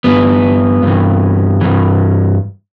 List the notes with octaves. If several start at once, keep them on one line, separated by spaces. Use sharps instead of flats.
G2 E3 B3
G2 E3
G2 E3